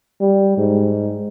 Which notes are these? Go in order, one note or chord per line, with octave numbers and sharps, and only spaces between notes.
G3
G#2